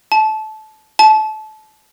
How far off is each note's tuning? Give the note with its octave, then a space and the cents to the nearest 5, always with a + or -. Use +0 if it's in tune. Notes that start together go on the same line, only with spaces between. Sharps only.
A5 -20
A5 -25